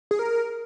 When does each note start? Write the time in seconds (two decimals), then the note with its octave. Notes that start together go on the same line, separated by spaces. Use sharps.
0.11 G#4
0.19 A#4